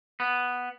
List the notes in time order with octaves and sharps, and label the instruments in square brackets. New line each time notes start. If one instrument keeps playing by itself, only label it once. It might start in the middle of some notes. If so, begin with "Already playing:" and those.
[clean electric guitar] B3